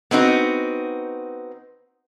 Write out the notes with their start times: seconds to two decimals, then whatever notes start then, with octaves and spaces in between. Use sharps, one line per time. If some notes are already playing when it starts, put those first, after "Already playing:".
0.11 B3 C4 D#4 F#4